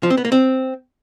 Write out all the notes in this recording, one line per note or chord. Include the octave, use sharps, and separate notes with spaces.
F3
C4
B3
A#3
C4